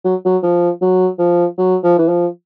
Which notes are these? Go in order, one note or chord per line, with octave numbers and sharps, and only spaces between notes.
F#3
F#3
F3
F#3
F3
F#3
F3
E3
F3